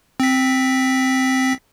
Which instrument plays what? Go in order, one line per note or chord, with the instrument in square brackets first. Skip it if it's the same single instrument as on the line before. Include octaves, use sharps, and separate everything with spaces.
[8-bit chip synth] C4 B6